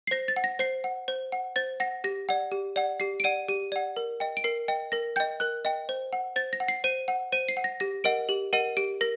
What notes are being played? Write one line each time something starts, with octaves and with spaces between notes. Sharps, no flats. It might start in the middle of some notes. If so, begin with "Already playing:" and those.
C7
C5 A#6
A6
F#5
A#6
C5 C7
F#5
C5
F#5
C5 A6
F#5 A#6
G4 A#6
D5 F#5
G4
D5 F#5
G4 C7
D7
D5 F#5 D#7
G4 D#7
D5 F#5
A#4
D#5 G5
D7
A#4 C7
D#5 G5
A#4 A#6
D#5 G5 G6
A#4 F#6
D#5 G5
C5
F#5
C5 A6
A#6
F#5
C7
C5 D#7
F#5
C5 D#7
C7
F#5
A#6
G4 A#6
A#4 D#5 F#5 D7
G4 F#7
A#4 D#5 F#5 D#7
G4 D7
A#4 A#6